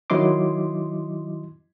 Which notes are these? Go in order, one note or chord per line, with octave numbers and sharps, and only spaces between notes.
D#3 F#3 E4 D#5 C6 D6